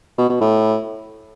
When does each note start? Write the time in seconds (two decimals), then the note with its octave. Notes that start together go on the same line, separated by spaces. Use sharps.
0.18 B2
0.29 B2
0.41 A2